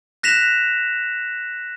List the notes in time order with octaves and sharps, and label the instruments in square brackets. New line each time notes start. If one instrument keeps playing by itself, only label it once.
[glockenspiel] F#6 A#6 B6 E7 F7